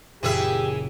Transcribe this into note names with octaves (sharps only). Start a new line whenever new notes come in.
F#1 A#2 E3 G4 G#4 E5